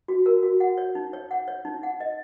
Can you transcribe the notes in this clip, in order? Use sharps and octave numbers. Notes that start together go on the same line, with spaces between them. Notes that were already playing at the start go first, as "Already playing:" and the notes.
F#4
A#4
F#4
F#5
C#5
D#4
C#5
F#5
C#5
D#4
F#5
D#5